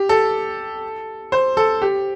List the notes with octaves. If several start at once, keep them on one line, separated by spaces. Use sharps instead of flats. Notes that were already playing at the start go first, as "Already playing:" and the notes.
Already playing: G4
A4
C5
A4
G4